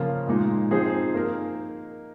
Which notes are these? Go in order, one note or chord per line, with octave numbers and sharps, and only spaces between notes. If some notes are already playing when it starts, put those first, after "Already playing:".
Already playing: C#3 F3 A#3 F4
A#2 G#3 D#4
F3 C4 D#4 G#4 C5
A#3 D#4 A#4